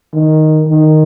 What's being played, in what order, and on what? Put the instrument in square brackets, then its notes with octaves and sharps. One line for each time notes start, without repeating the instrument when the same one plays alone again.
[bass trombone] D#3
D#3